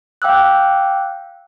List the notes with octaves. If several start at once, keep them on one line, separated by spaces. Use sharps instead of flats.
F5 G5 D6 E6 F#6